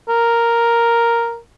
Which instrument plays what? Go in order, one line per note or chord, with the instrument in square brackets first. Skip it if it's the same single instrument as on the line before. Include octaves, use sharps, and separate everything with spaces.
[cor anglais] A#4